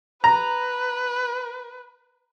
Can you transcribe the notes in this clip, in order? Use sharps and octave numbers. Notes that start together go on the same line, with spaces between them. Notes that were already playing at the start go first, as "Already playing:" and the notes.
B4 A#5